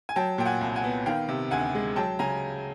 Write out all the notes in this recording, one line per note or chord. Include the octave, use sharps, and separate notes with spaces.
G#5
F#3 G5 A5
A#2 G5
F#5 G#5
C2
F#5 G#5
B3
D#3 F5 G5
C3
D2 F#5 G#5
G#3
F#3 G5 A5
C#3 G#5 A#5